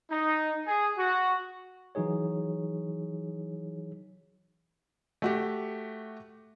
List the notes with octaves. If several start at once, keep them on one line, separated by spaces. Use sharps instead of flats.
D#4
G#4
F#4
E3 F#3 D#4 G#4 C#5
A3 F#4 G4